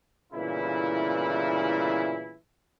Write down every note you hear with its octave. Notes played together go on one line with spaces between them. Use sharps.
G1 A#2 C#3 E3 E4